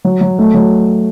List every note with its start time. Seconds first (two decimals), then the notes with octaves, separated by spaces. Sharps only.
0.05 F#3
0.21 F#3
0.39 A3
0.54 F#3